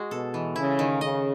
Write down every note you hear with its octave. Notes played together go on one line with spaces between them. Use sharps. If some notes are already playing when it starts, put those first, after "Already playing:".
Already playing: G#3 F#4
B2 A4
E3
C#3 E4
D#3
C#3 D#5